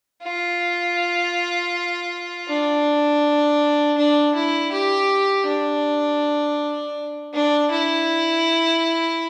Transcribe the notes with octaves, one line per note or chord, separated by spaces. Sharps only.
F4
D4
D4
E4
G4
D4
D4
E4